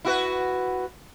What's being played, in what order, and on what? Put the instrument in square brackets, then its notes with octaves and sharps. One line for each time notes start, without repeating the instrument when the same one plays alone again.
[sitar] E4 F#4 B4